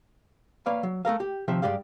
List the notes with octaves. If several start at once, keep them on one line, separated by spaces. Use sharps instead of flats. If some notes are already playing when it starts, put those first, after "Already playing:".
A#3 B4 C#5 D5 F5
F#3
A3 A4 A#4 F5
G4
D#2 C3 F3 E5 G5
G2 C3 G#3 G4 D5 F5